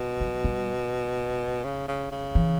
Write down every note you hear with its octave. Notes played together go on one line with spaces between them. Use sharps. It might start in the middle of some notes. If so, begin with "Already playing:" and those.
Already playing: B2
F#3
G3
C#3
C#3
C#3
E3